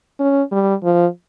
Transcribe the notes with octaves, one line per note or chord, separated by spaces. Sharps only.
C#4
G3
F3